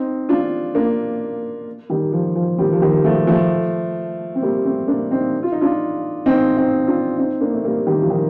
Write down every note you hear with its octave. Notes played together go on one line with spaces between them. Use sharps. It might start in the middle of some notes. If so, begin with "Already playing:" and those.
Already playing: C4 D#4
D4 F4
A#3 D4
D#3 G3
F3
F3
D#3 G3
F3
D#3 G3
F3 A3
F3 A3
C4
G3 A#3
A3 C4
A#3 D4
C4 D#4
F4
D#4
D4 F4
C4 D#4
C4 D#4
D4 F4
C4 D#4
A#3 D4
A3
G3 A#3
D#3 G3
F3
D#3